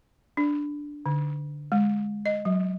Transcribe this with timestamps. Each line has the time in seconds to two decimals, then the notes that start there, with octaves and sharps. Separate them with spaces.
0.37 D4
1.06 D3
1.72 G#3
2.26 D#5
2.45 F#3